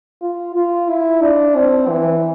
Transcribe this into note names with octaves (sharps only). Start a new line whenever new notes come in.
F4
F4
E4
D4
C4
E3